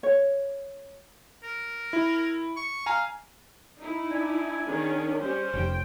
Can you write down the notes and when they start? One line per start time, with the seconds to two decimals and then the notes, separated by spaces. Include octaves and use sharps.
0.03 C#5
1.43 A#4
1.93 E4
2.57 C#6
2.86 F5 G#5 A#5
3.78 D#4 E4
4.11 D4 G#5
4.65 D#3 C#4 G#4
5.21 G3 C#4 C5
5.54 F1 G5